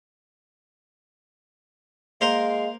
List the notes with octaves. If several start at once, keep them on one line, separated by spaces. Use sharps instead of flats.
G#3 A#3 A#4 C5 F5